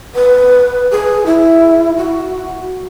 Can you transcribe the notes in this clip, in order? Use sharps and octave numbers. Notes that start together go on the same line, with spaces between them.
B4
G#4
E4
F#4